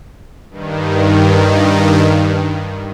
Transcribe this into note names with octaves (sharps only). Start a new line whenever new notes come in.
G2 D#3